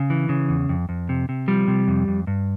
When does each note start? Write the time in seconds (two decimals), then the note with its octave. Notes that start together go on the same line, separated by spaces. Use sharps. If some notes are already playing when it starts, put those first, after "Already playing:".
Already playing: C#3
0.10 E3
0.29 C#3
0.49 E2
0.69 F2
0.89 F2
1.09 C3
1.29 C3
1.48 F3 G3
1.68 C3
1.88 F2
2.08 F2
2.27 G2